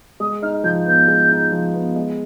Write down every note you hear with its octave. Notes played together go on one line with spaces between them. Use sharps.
G#3 D#6
D#4 F6
F3 G6
B3 G6
G#3
D#4
F3
B3
G#3